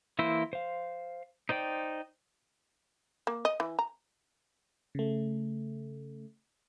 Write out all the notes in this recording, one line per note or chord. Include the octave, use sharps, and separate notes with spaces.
E3 A#3 E4 C5 E6
C5 F5
D#4 C5 D5 G5
A#3
D#5
E3
A#5
C#3 A3